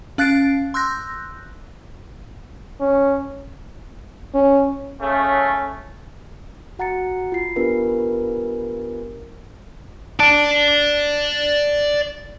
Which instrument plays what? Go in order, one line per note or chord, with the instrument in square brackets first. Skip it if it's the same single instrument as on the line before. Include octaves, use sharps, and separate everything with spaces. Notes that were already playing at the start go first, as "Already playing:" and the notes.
[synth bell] C#4 F5 F#6 A6 C7 D7
C6 E6 F#6 G6 A#6
[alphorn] C#4
[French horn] C#4
[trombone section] C#3 A3 [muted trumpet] C#4
[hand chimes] F#4 F#5 A#5 A6 C#7
F4 C7
B3 D4 F4 G4 A#4 B4
[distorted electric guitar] D5 A5